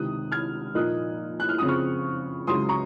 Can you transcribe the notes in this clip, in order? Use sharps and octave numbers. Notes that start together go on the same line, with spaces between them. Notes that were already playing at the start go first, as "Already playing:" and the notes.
Already playing: C#2 C3 D#3 D#6 F#6
F6 G#6
A#2 F3 A#3 D#4 D#6 F#6
F#6
F6
F2 C#3 F3 C4 D#6
C#6 F6
C#2 C#3 F#3 C6 D#6
A#5 C#6